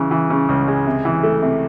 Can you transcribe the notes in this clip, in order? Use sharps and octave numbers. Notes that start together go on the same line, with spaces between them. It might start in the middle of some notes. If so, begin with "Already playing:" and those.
Already playing: C#3 E3
E3
C#3
C#2
G#3
C3
E3
A3
C3